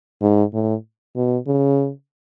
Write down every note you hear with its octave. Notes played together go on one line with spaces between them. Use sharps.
G#2
A2
B2
C#3